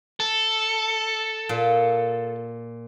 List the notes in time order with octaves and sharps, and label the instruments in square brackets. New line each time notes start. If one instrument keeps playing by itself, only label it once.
[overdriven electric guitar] A4
[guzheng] A#2